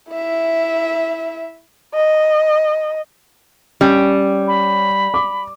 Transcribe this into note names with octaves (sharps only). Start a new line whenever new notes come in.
E4 E5
D#5
G3 C#4
B5
D6